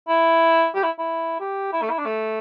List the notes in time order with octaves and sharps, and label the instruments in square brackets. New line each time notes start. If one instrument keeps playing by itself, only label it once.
[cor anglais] E4
G4
E4
E4
G4
E4
A3
E4
D4
A3